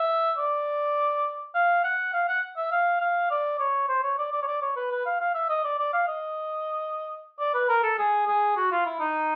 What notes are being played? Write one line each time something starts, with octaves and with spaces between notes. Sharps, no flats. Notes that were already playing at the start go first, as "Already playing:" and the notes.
Already playing: E5
D5
F5
F#5
F5
F#5
E5
F5
F5
D5
C#5
C5
C#5
D5
D5
C#5
D5
C#5
B4
B4
F5
F5
E5
D#5
D5
D5
F5
D#5
D5
B4
A#4
A4
G#4
G#4
F#4
F4
E4
D#4